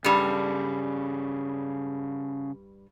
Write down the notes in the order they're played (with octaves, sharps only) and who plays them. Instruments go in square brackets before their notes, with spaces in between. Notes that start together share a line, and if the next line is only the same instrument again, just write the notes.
[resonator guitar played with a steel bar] G2 G3 [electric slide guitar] C#3 A4